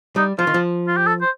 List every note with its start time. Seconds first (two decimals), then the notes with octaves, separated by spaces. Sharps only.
0.16 G3 D#4
0.39 F3 F4
0.47 D#3
0.54 F3
0.88 F4
0.97 G4
1.07 A4
1.21 C5